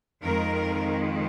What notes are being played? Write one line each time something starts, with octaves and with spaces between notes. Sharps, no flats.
F2 D#3 G#3 A#4